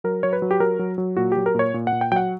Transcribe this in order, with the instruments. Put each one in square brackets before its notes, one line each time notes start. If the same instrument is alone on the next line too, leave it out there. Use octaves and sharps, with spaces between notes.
[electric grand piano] F#3 A#4
F#3 C#5
B4
F#3
G4
F#3 A#4
F#3
F#3
A#2 F#4
F#3 G4
A#4
A#2 C#5
A#2
F#5
A#2
G5
F#3 G5
F#5